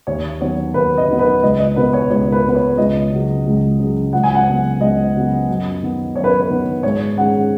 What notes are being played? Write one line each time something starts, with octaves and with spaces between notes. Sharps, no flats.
D#2 C#5
D#3 F#3 B3 C#5
D#2 B4
D#5
D#3 F#3 B3
B4
C#2 D#5
D#5
B2 B3 B4
C#5
C#2 C#5
B4
B2 B3 B4
C#5
C#2 D#5
C#3 F#3
C#2
C#3 F#3
C#2 F#5
G#5
F#5
C#3 F#3 B3
C#2 D#5
C#3 F#3 B3
F#2
D#3 B3
F#2 C#5
B4
B4
D#3 B3
G#2 C#5
D#3 G#3 C#4 F#5